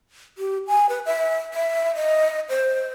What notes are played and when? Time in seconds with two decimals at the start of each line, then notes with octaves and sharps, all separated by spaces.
0.38 G4
0.67 G#5
0.89 B4
1.06 E5
1.54 E5
1.95 D#5
2.49 C5